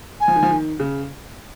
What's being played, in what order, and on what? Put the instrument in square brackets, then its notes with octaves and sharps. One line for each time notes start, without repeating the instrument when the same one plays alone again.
[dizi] G#5
[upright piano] F3
D#3
F3
D#3
C#3